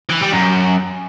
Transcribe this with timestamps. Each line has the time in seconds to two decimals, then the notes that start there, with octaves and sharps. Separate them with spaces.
0.09 E3
0.21 G3
0.32 F#2